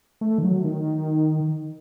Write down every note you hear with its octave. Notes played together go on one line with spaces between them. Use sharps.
A3
D#3
F#3
D#3